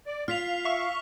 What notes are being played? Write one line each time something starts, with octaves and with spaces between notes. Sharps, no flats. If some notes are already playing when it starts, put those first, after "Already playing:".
D5
F4 F5 F6 B6 F7
E5 C#6